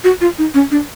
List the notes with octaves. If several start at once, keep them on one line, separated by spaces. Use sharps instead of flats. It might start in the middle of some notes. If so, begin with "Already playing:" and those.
F#4
F4
D#4
C#4
D4